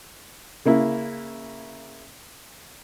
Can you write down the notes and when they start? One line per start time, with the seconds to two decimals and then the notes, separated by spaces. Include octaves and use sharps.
0.65 C#3 A#3 E4